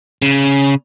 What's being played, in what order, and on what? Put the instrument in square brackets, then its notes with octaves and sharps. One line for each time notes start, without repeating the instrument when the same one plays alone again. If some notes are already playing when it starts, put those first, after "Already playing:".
[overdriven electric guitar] C#3